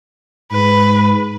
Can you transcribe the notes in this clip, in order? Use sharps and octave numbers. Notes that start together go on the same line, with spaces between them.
G#2 B4